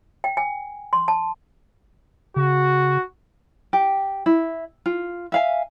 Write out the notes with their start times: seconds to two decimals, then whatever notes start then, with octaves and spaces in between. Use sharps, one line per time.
0.24 G5
0.37 G#5
0.93 C6
1.08 A5
2.36 C#3 F#4
3.73 G4
4.26 E4
4.86 F4
5.32 E5 F5 G#5